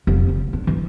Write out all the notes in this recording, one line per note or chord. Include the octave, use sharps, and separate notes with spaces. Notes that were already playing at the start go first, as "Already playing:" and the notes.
F1
C#3
D4
E3